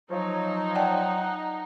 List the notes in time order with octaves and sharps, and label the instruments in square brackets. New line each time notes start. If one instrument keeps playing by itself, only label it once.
[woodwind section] F3 F#3 [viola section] D#4 [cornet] C#5
[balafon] D5 G5 A5 [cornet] F#5